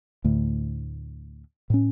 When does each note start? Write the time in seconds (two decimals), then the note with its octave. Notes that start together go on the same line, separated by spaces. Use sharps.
0.24 D2 A2
1.70 A2 C#4